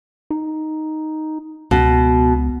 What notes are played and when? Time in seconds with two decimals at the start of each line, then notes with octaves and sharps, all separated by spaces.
0.30 D#4
1.71 C#2 B2